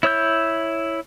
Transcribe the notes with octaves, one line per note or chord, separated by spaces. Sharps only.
E4 C#5 E6 G6